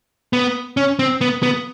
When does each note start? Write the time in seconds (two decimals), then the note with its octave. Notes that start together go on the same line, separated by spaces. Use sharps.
0.33 B3
0.77 C#4
0.99 C4
1.21 B3
1.43 B3